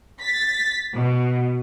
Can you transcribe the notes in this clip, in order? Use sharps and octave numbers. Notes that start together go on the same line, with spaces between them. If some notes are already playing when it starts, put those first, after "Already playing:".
A6 B6
B2